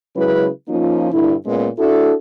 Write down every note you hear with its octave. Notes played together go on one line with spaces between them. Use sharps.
C#3 F#3 G#3 C#4 E4 B4
F3 A#3 C#4 D#4 F4
G2 A#2 D3 E4
A#2 G#3 B3 C#4
D4 E4 F#4 A4